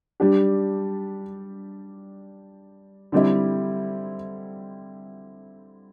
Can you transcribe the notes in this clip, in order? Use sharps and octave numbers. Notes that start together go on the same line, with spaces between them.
G3 D4 G4
D3 G3 C4 E4